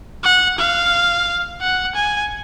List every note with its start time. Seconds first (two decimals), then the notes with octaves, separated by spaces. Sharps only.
0.23 F#5
0.58 F5
1.61 F#5
1.95 G#5